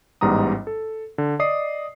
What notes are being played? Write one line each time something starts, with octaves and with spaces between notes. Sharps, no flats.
A1 G#2 G3 B3 A#5 D#6
A4
D3
D5 D#5 D#6 C7